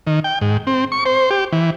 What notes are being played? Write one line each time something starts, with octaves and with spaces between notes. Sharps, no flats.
D#3
G5
G#2
C4
C#6
C5
G4
E3